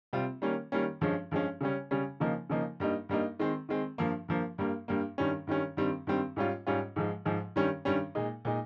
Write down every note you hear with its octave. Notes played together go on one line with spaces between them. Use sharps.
C3 G3 C4 F4
D#3 G3 A#3 C#4
D#3 G3 A#3 C#4
G2 F3 G#3 C#4
G2 F3 G#3 C#4
C#3 G3 C#4
C#3 G3 C#4
C#3 F3 A#3 D#4
C#3 F3 A#3 D#4
G2 G3 A#3 D#4
G2 G3 A#3 D#4
D#3 G#3 C4
D#3 G#3 C4
G2 F3 A#3
G2 F3 A#3
G2 G3 A#3
G2 G3 A#3
G2 D#3 G3 C#4
G2 D#3 G3 C#4
G2 D#3 G3 C4
G2 D#3 G3 C4
G#2 G3 C#4 F4
G#2 G3 C#4 F4
G#2 F3 G#3
G#2 F3 G#3
G2 D#3 G3 C#4
G2 D#3 G3 C#4
A#2 G#3 D#4
A#2 G#3 D#4